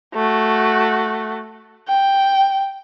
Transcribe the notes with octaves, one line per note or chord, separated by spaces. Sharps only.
A3 F#4
G5